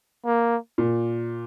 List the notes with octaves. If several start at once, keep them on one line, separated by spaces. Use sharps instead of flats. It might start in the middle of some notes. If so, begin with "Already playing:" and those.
A#3
A#2